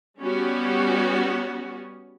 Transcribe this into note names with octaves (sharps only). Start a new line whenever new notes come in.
G3 B3 C#4 F#4